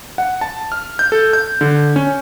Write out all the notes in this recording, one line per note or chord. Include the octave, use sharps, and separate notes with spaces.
F#5
A5
F6
G6
A4
G6
D3
C#4